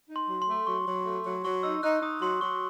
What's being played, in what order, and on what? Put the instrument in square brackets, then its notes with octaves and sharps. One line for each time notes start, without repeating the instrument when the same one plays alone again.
[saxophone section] D#4
[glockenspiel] C6
[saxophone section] F#3
[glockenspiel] C6
[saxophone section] A3
[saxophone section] F#3 [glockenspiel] C#6
[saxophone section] F#3
A3
F#3
[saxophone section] F#3 [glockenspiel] C#6
[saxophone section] D#4 [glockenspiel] E6
[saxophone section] D#4 [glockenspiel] F#6
[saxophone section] D#4 [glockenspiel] D#6
[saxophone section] F#3 [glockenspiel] C6
[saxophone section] F#3 [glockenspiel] C#6